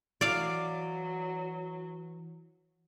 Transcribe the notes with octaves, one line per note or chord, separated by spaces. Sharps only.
E3 F#3 D5 F5